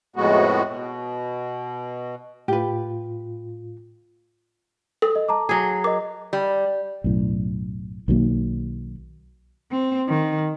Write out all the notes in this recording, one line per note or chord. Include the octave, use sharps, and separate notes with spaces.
F2 A2 G#3 B3 F#4
B2
A2 F4 G4 B4
A4 D#6
D#5
A5 A#5 D6
F#3 G#4
A#4 D#5 D6
G3
B1 F#2 A2
B1 D#3 F#3 A#3
C4
D#3